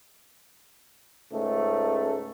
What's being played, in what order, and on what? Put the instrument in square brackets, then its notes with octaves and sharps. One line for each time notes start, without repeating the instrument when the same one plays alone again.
[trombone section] C#2 G#2 A3